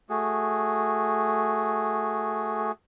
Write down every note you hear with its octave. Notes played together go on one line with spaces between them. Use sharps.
A3 F#4 G#4